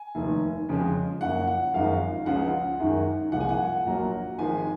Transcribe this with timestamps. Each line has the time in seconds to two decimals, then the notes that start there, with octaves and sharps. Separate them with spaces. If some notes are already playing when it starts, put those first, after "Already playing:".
Already playing: G#5
0.15 F1 D#2 D#3
0.69 F2 C#3 F3 G#3
1.21 F#1 F#2 F3 F#5
1.47 F#5
1.74 G#1 F#2 F3 G#3 F5
2.26 C#2 C#3 F3 F#5
2.80 F#2 D#3 G#3
3.32 C2 A#2 F3 G#3 F#5
3.40 G#5
3.49 F#5
3.85 A#1 A#2 F#3 A#3
4.38 G#1 G#2 F3 G#3 G#5